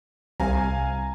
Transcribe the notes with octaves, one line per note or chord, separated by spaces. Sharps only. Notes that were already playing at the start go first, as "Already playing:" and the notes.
C2 F5 G#5 A#5